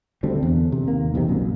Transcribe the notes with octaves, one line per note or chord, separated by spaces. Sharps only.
D2 D3 G3 C4
E2
C3
D#2 A#3
B1 E2 C3 D#3
A#1 F#2